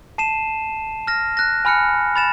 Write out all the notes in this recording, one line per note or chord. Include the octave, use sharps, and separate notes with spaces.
A5 C7 D#7 E7
F6 A#6
F#6 A#6
G#5 B5 F6 F#6 C#7
B5 A6 E7